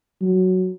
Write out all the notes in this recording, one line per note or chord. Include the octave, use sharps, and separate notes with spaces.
F#3